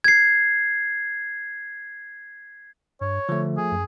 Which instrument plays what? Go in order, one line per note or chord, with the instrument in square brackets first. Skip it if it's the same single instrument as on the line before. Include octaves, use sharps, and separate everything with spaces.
[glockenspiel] G#6 C7
[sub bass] G2 [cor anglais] C#5
[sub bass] D3 [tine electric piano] F3 A3
[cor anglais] G#4
[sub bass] F#2